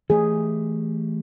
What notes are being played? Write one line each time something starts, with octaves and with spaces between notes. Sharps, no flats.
E3 A3 G4 G#4